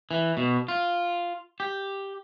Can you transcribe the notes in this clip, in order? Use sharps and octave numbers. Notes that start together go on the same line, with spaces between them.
E3
B2
F4
G4